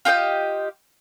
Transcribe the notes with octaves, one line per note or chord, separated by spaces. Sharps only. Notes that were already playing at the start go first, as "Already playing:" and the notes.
F4 G4 D#5 G5